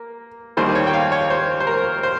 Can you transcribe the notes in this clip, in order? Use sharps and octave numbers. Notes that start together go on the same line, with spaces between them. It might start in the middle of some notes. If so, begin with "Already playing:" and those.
Already playing: A#3
D#2 D#3 G3 A#3 C5
C#5
G5
F5
C#5
C5
C5
A#4
C5